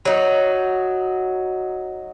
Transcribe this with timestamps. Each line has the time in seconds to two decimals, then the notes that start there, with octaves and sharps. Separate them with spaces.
0.05 F#3 D#4